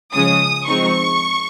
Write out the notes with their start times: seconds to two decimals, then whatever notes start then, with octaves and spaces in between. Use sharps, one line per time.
0.14 C#3 F3 G#3 C#4 D#6
0.67 F3 G#3 C4 D#4 C#6